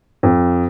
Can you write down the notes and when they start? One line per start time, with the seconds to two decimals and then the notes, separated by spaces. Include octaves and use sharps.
0.23 F2